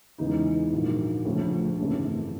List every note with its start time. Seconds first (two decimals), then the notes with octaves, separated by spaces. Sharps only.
0.18 E2 C#3 E3 G#3 D#4
0.73 A#1 G#2 D#3 F#3
1.25 D2 C#3 F3 A3 C#4
1.78 G#1 F#2 C#3 E3 A3